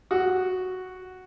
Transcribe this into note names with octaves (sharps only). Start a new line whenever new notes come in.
F#4